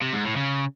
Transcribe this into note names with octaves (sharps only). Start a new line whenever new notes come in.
C3
G#2
A2
C#3